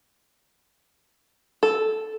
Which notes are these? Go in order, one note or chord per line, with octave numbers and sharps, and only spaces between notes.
A4